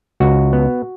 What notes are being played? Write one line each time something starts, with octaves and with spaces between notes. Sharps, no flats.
C#2 F#4
B3